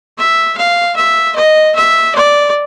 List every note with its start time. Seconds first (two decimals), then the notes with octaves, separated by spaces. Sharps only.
0.18 E5
0.57 F5
0.96 E5
1.36 D#5
1.75 E5
2.15 D5